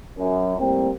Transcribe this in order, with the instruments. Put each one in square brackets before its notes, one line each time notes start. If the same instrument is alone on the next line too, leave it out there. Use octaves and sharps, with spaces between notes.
[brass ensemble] F#2
A2 G3 A#3 C4